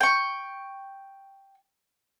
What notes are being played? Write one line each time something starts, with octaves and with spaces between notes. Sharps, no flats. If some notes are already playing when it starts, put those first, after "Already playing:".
G5 C#6